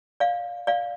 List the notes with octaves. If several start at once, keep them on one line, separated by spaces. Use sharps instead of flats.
D5 F5
D5 F5